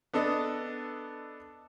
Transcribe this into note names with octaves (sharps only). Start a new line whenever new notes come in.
B3 D4 A4 D#5